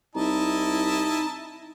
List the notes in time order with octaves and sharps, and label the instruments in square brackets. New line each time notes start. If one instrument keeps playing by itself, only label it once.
[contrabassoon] C2 [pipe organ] D#4 [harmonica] E4 D#5 A5